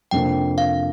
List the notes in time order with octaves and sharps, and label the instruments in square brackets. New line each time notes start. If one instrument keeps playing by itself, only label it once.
[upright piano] F2 C3 A#3 D4 [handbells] G5
[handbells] F5